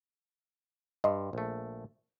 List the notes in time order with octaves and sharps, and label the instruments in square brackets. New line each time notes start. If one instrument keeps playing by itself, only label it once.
[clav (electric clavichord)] G2 [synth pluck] D#5 C6
[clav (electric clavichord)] A#1 A3